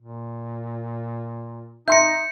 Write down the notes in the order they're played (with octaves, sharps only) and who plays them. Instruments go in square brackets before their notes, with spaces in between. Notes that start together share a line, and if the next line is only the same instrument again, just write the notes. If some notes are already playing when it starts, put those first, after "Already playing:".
[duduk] A#2
[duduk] D#4 [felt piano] E5 C6 A#6 [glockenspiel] G6 C#7